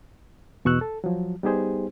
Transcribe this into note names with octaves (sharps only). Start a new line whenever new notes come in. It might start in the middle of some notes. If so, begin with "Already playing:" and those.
E2 B2 C#6 E6 F#6
A4
F3 F#3
G3 B3 D#4 G4 G#4 C5